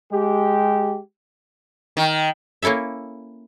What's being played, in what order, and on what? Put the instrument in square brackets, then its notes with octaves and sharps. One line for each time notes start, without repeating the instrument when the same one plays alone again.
[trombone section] G#3 G4
[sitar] D#3
[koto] A#3 C#4 E4 A4 E5